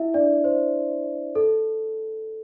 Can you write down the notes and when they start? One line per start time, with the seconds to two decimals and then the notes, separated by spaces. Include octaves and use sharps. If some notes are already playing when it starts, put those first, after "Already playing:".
Already playing: E4 E5
0.14 D4 D5
0.44 C5
1.35 A4